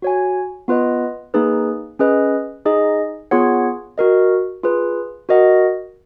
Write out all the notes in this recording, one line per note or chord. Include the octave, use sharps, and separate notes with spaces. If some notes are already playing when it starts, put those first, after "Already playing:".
F#4 C#5 G#5
B3 F4 B4 D#5
A#3 D#4 G#4 B4
C#4 G#4 B4 D#5
D#4 G#4 D#5
B3 F4 G#4 C#5 F#5
F#4 A#4 D#5
F4 G#4 B4
F#4 A#4 D#5 F#5